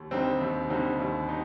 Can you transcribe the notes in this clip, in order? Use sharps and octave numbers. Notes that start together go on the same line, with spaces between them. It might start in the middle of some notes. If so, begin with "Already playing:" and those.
Already playing: D#2
D3 G3 C4 D#4
D#2
D3 G3 C4 D#4
D#2
C4 D#4